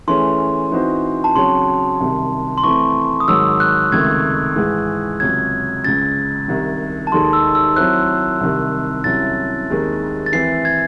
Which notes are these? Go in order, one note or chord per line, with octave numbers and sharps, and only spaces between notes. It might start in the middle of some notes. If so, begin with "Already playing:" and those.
E3 A3 C#4 G#4 C6
E3 C4 D#4 F#4 C5
A5
C#3 F#3 C4 F#4 C#5 C6
C2 C3 D#3
C6
E3 A3 C4 C#6
D#6
G#2 D#3 F#3 E6
F#6
C#2 C3 D#3 A3 G#6
G#2 E3 G#3
C#2 C3 F#3 G#6
C#2 C#3 G#3 A6
C2 C3 D#3
A5
D#2 D#3 G#3 D#4 A4 C6
E6
E6
F#3 C4 E4 C5 F#6
C2 C3 D#3
C2 C3 F#3 C#4 E4 A6
D#2 D#3 G#3 C4
A6
E3 C4 E4 C7
G#6